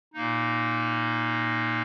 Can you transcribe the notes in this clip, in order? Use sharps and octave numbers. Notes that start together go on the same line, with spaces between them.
A#2 A#3 D#4